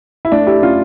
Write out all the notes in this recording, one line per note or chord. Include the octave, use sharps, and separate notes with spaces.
E4
A3 D4
E4 G4
C#4 F4